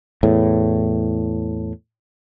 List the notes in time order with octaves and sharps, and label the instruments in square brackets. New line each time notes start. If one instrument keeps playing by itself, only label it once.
[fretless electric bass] E2 A2